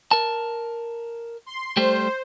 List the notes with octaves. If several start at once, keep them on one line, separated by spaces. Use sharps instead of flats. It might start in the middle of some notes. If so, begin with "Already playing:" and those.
A#4 A5
C6
G3 A3 G4 C5